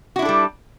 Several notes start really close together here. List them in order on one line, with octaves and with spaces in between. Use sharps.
F#4 E4 D4 A4 G3